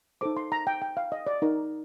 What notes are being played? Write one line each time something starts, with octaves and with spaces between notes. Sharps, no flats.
D#4 A4 C5 D6
C6
A#5
G5
G5
F5
D#5
D5
D#4 A#4